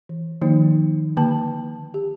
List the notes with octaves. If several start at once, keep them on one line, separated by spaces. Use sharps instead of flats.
E3
D#3 F3 A#3 D#4
D3 A#3 A5
G4